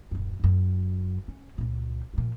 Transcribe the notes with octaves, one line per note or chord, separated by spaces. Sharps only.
D#1 F#2
F#1 F#2
C#4
C#2 A#2
A#2 F3